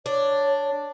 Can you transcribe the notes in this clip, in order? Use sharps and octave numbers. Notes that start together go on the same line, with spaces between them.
D4 C#5